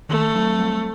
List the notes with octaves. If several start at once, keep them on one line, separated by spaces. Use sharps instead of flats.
D#3 A3
F#3 C4
G3